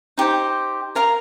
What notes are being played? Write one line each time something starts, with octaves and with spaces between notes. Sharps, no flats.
D#4 G4 C5
A#4 F5 A#5